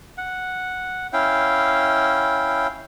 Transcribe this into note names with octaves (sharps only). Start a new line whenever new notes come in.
F#5
C#4 E4 F5 G5